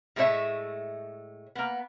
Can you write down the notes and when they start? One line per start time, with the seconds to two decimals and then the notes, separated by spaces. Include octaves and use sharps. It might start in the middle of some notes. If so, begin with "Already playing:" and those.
0.16 A2 G#3 A3 C#4 C#5 E5
1.55 A#3 B3